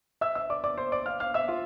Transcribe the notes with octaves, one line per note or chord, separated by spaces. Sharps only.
E5 E6
E5 E6
D5 D6
D5 D6
C5 C6
D5 D6
F5 F6
F5 F6
E5 E6
F4 F5